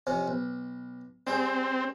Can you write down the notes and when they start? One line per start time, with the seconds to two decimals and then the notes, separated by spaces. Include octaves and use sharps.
0.07 F2 C3 C#4
0.28 B1
1.27 G3 C4 G#4 G5